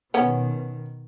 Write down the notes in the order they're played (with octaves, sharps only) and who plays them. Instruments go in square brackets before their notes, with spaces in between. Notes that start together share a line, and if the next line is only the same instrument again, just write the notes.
[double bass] B2 D#3 [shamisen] B3 C#4